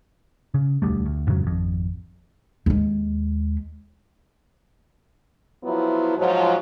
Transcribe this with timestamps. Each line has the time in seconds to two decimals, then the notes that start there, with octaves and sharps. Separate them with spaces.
0.54 C#3
0.82 E1 D2 G3 A3
1.06 D2
1.27 F2 G#2 C#3 F#3
1.43 G#1 F2
2.66 D#2 G#3
5.64 F3 F#3 B3 E4
6.18 G#2 F3 F#3